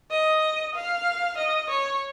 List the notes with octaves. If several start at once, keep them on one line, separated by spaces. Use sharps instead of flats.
D#5
F5
D#5
C#5